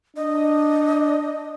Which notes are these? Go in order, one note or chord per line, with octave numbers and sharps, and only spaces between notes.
D4 D#5